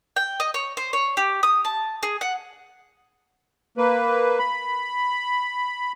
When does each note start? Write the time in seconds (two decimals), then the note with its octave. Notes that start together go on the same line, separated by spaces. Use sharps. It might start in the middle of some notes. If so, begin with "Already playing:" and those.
0.16 G5
0.40 D#5
0.54 C#5
0.77 C5
0.93 C#5
1.17 G4
1.43 D#6
1.65 A5
2.03 G#4
2.21 F#5
3.78 A#3 B4
4.39 B5